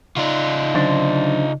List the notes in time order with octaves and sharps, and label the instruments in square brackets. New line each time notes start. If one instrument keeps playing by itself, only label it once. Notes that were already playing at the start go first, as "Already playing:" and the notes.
[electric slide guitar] C#3 D5 [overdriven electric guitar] D#4 F4
[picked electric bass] D3 F#3 C#4 [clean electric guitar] D4 C5